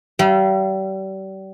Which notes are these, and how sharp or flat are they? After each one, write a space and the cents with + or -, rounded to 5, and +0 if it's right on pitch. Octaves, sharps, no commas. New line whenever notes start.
G3 -35 E5 +45